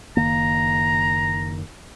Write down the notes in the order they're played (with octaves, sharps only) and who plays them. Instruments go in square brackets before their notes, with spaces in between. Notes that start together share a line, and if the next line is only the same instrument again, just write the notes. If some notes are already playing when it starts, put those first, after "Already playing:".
[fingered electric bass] F#1 D#3 A#3 [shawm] A#5